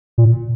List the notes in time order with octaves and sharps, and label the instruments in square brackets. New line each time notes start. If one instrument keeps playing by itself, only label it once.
[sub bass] A#2